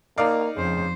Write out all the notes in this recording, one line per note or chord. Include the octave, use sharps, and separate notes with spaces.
A#3 D#4 D5 F5
F2 C#3 C5